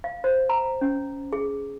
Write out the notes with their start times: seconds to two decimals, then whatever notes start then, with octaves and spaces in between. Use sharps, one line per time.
0.04 F5
0.24 C5
0.49 A#5
0.81 C#4
1.33 G#4